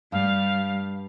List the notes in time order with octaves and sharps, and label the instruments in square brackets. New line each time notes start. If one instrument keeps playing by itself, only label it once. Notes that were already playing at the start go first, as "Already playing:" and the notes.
[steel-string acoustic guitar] G2 [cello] G3 [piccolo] F5